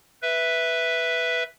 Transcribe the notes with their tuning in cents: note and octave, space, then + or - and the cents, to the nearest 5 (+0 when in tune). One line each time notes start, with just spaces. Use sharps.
B4 +0 E5 +0